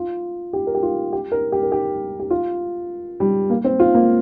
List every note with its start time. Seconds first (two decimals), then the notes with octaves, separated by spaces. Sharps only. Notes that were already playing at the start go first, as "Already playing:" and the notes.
Already playing: F4
0.53 G4
0.67 A#4
0.75 G4
0.83 F4
1.13 G4
1.32 A#4
1.52 G4
1.63 A#4
1.72 G4
2.20 G4
2.30 F4
3.20 G3
3.50 A#3
3.64 C4
3.80 F4
3.94 A#3